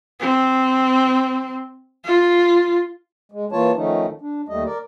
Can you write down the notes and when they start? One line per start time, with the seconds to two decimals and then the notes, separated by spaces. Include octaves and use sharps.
0.20 C4
2.05 F4
3.32 G#3
3.52 E3 A#3 F4 C#5 A5
3.76 D#3 F3 A3 C#4 D#4
4.21 D4
4.48 D#2 G3 A3 D#5
4.65 A#4 D5